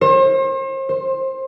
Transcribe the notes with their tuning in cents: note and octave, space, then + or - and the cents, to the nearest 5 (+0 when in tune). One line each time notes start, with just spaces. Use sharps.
C5 +40
C5 +20